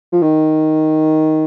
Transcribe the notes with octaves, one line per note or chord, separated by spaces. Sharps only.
F3
D#3